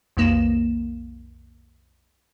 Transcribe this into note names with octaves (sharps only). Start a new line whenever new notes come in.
B1 F2 D#3 A#3 E7